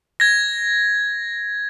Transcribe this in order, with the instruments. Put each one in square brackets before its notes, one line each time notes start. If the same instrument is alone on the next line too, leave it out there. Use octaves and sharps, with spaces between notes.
[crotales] G#6 A#6